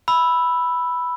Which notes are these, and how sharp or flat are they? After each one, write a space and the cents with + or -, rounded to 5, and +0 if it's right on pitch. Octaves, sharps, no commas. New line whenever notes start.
B5 +0 E6 +0